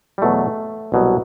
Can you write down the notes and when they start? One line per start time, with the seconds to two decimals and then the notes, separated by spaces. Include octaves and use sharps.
0.18 G3
0.22 E2 B2 F#3 A3
0.92 C2 B2 F#3